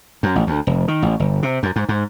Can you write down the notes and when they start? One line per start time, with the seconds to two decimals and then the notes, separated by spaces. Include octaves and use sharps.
0.23 F#2
0.35 A1
0.47 D2
0.67 F1
0.88 D#3
1.02 A1
1.20 G1
1.43 C3
1.63 F#2
1.76 G#2
1.89 G#2